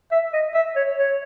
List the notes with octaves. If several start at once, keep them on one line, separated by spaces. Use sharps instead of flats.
E5
D#5
E5
C#5
C#5